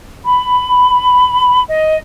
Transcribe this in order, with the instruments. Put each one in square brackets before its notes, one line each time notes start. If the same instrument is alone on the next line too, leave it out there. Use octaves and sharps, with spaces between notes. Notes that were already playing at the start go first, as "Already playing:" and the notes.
[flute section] B5
D#5